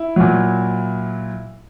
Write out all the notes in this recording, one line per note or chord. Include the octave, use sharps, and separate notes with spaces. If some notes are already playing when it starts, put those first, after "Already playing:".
Already playing: E4
A#2 F#3